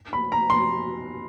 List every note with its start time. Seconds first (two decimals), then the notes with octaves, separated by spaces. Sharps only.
0.13 B5
0.32 A#5
0.50 C6